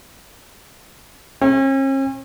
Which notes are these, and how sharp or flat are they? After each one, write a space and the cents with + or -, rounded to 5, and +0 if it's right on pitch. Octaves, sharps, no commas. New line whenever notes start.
C#4 -45